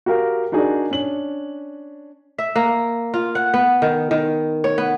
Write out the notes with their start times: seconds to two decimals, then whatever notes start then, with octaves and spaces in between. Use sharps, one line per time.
0.06 F#4 G4 A#4 F5
0.52 D4 D#4 F#4 G#4 A#4 D5
0.91 C#4 D4 F#7
2.38 E5
2.56 A#3
3.14 F4
3.35 F#5
3.54 B3
3.82 D#3
4.11 D#3
4.64 C#5
4.78 B3